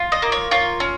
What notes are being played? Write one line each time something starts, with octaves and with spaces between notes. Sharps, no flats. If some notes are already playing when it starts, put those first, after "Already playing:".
Already playing: F4
D#5
A#3
C#5
F4 C#5
C#4